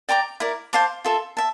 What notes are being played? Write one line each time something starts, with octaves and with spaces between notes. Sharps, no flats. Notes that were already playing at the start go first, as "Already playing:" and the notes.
D5 G5 A#5 D6
E4 A#4 D5
C5 F5 A5 D6
F4 A4 E5
E5 A5